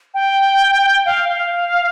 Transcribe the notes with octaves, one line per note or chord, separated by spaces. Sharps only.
G5
F5
F5